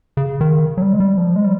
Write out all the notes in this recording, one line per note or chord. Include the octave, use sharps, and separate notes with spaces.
C#3
D#3
F#3
G3
G#3
G3
F3
G#3
G3